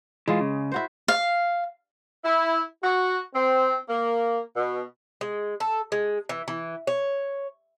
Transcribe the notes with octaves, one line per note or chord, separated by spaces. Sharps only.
E3 G#3 F4
C#3
E4 F#4 C5
F5
E4
F#4
C4
A#3
B2
G#3
A4
G#3
E3
E3
C#5